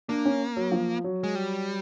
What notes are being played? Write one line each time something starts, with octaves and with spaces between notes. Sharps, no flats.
A#3 D4
C#4
F#3
F3
F#3
G#3
G3